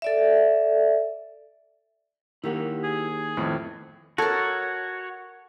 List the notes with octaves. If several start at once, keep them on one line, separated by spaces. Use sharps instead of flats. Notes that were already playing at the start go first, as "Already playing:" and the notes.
A4 D5 E5
D#3 A#3 E4 G4 C#5 F#5
G#4
F2 A2 D#3 B3
F#4 A4 A#4 C#5